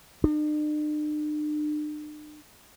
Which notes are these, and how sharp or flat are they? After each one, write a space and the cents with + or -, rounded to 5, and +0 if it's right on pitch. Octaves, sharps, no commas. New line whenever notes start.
D4 +45